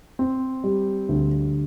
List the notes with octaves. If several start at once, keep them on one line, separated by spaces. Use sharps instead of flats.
C4
G3
D2